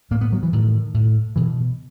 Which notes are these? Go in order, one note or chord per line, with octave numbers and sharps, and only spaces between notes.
A2 A#3
B3
F#3
E3
A2 D#3
A2
B2 E3